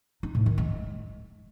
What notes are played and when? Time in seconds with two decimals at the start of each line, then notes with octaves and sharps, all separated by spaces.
0.23 D#4
0.35 A2
0.46 D#3
0.58 G#3